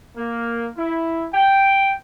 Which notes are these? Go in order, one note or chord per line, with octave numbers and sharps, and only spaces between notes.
A#3
E4
G5